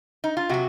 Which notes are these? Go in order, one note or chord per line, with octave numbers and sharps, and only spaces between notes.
D#4
F4
C3 F#3 F#4